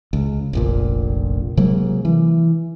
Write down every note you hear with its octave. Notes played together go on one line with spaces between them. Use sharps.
C#2
F1 A#1 A#2
C3 F#3 G#3 A#3
E3